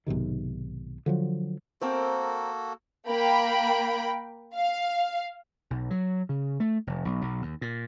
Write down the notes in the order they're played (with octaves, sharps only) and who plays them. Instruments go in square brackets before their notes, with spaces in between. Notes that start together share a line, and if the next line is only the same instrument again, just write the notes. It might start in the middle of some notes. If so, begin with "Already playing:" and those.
[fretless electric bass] B1 G#2 C3 D#3
D3 F3 F#3
[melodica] A#3 F#4 A4 [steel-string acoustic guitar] C4 A#4 C5
[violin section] A#3 G5 B5
F5
[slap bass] B1
F#3
C#3
A3
F1
B1
B1
D#2
A#2